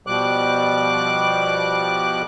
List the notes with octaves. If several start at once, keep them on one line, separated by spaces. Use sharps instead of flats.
B2 F3 G3 D6 F#6